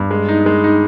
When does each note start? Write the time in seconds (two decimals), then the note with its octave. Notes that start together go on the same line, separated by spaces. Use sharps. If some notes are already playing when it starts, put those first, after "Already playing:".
Already playing: G2
0.11 G#3
0.29 D#4
0.46 G#3
0.64 D#4